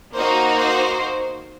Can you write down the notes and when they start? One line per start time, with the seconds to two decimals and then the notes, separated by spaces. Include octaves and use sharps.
0.14 A#3 D#4 F#4 C5
0.57 C5